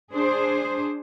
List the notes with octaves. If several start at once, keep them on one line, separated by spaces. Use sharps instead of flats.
D4 G#4 C5